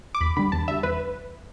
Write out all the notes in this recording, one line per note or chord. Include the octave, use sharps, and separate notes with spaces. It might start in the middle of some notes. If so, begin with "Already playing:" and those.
D6
E2 B5
D3 G3 B5
E2 A5
D3 G3 E5
E2 B4